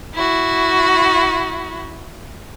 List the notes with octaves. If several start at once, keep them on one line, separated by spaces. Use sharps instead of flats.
E4 F#4